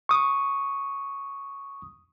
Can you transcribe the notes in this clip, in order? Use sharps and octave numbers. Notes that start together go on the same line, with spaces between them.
C#6 D#6